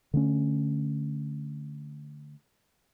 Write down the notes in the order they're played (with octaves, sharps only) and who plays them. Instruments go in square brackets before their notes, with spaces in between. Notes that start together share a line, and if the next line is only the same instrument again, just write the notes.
[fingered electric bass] D3 A3 C#4